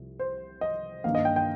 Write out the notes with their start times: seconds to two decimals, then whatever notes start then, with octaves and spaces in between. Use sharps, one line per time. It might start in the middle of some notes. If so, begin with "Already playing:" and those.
Already playing: C2 F3
0.19 C5
0.61 D#5
1.04 G2 D#3 A#3 F5
1.15 D#5
1.25 G5
1.36 G5